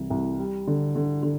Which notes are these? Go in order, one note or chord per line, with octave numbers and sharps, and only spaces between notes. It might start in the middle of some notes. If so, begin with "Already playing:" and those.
Already playing: C2 E3
C2
G3
D3
D3
D3